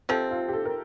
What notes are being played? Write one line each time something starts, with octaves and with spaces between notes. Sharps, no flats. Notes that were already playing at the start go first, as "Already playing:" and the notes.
C3 F3 C4 A4
F4
G4
A4
A#4